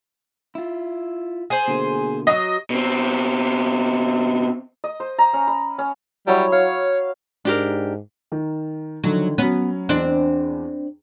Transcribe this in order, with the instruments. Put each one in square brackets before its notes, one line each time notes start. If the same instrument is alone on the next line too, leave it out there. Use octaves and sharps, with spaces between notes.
[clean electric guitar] E4 F4
[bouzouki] G#4 C5
[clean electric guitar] B2 D3 A#3
[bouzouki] F#3 [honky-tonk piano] D#5
[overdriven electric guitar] B2 C4
[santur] D#5
C5
A#5
C#4
B5
C#4
[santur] F#3 E4 C#5 [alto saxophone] G3
[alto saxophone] C#5 [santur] F5
[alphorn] G#2 [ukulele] D4 G4 A#4
[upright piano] D#3 A#4
[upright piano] D3 D#3 F3 [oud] F#3
[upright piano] F#3 C#4 [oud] B3
[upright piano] E2 [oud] C4 D4